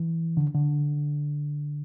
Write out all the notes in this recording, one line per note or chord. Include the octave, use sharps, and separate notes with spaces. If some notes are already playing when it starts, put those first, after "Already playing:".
Already playing: E3
D3
D3